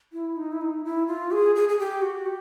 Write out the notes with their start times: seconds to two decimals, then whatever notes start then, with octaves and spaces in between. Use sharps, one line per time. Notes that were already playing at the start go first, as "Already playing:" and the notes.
0.13 E4
0.36 D#4
0.52 E4
0.61 D#4
0.85 E4
1.07 F4
1.32 G#4
1.56 G#4
1.69 G#4
1.79 G4
2.02 F#4
2.26 G4